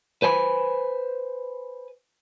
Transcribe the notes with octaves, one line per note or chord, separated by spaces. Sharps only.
B4 C5 G#5 B5